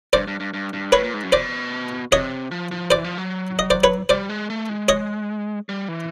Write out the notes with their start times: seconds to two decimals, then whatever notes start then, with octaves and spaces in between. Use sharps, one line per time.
0.13 G2 C5 D5
0.27 G2
0.40 G2
0.53 G2
0.73 G2
0.92 A2 B4 C#5
1.03 A#2
1.13 G#2
1.23 F#2
1.32 B2 C5 D5
2.12 C3 C#5 D#5
2.51 F3
2.71 F3
2.91 E3 C5 D5
3.04 F3
3.18 F#3
3.59 D#5
3.70 C5 D5
3.84 B4 C#5
4.09 G3 C5 D5
4.29 G#3
4.50 A3
4.69 G#3
4.88 C#5 D#5
5.69 G3
5.88 E3